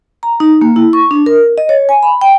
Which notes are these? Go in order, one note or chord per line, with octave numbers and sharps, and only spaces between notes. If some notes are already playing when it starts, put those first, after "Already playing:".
A#5
D#4
A#3
E4
C#6
D4
A#4
D#5
C#5
G#5
B5
G5